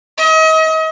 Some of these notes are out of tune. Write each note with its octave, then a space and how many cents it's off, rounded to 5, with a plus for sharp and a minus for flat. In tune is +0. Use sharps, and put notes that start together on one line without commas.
D#5 +40